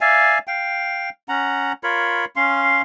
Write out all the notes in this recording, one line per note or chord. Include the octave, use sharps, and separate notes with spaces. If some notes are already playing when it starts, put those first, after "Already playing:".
D5 E5 F5 G#5
F5 G5
C#4 F#5 A#5
F4 A#4 C#5 B5
C#4 F5 C6